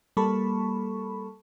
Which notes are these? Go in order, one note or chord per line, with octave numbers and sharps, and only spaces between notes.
G3 A#3 A4 A5 B5 C#6